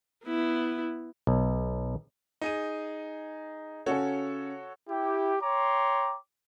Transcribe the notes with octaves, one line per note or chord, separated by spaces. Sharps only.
B3 E4
B1
D#4 G#4 D#7
C#3 C#4 F#4 A4 C#5
E4 G4
C#5 G5 A#5 C6 D6